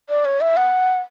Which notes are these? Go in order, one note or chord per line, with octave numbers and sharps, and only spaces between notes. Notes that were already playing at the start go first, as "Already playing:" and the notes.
D5
C#5
E5
F#5